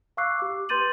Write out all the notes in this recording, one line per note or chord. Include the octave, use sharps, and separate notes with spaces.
F5 C#6 D6 E6 F#6 C7
G4 D6
B4 C6 G6 A6 D#7 F#7